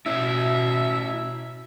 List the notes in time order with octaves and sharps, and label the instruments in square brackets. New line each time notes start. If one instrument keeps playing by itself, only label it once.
[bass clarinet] B2 [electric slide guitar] C#4 E4 [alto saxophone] E5